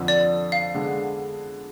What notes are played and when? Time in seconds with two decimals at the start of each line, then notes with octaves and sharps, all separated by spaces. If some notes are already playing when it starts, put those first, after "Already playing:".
Already playing: F2 D3 F3
0.08 D5
0.52 F5
0.74 D3 G#3 B3 D4